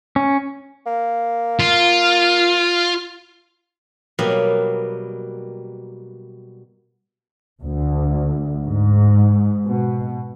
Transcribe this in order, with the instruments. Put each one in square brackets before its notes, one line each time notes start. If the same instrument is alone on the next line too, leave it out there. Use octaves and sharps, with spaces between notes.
[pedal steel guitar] C#4
[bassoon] A#3
[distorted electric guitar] F4
[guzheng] B2 F#3 G3 A#3
[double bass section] D2
G#2
B2